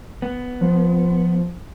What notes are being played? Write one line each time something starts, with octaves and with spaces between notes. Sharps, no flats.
B3
F3